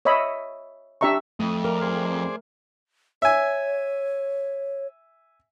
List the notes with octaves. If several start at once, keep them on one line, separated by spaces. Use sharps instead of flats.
C#5 D#5 E5 B5
D4 G4 E5 A#5 C#6
F2 A3 D#6
A#4 D5 F5
G#4 C5 D5
C#5 E5 G#5